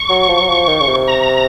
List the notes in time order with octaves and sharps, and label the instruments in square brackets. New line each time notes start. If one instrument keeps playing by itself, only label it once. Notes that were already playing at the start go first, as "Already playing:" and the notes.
Already playing: [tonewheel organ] C#6
[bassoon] F#3
F3
F#3
F3
D#3
C#3
C3
[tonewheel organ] A#5